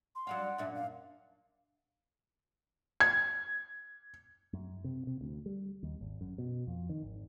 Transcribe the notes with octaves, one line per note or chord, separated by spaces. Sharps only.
C6
F#3 D4 F5 F#5
F#2 A#2 D4 E5
F5
G#6
F#2
C3
C3
D2
G3
D#2
G#1
F#2
B2
F2
D#3
G#1